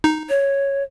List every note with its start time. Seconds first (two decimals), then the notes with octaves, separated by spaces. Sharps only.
0.04 D#4
0.29 C#5